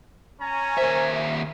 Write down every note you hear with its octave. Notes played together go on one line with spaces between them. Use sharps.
C#4 G#5 A#5
D#2 A#4 C5 E5